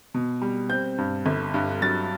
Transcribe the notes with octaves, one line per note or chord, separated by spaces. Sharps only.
B2
G3
C4 G6
G2
G1
G2
F#3 A6